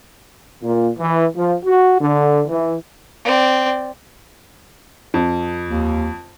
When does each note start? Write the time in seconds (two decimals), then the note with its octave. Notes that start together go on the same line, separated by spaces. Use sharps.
0.62 A#2
0.99 E3
1.36 F3
1.65 F#4
2.01 D3
2.48 E3
3.25 C4 D5
5.14 F2
5.68 D#2